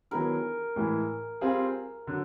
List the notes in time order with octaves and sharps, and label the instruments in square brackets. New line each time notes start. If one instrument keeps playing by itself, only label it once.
[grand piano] D#3 F#3 B3 E4 G#4 [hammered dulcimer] A#4
[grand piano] A2 E3 G#3
G3 C4 F4 G#4
D3 F#3